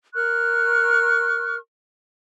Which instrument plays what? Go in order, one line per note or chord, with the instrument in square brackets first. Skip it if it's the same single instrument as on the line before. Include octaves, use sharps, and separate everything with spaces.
[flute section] A#4 C#6 F6 F#6